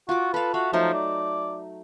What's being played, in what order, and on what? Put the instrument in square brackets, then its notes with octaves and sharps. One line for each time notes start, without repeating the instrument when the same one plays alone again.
[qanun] F4 D6 [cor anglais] F#4
[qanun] A4 F5 [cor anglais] B4
[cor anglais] F#4 [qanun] E5 F5 B5
[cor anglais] F3 [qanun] F#3 A3 D#4
[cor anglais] D5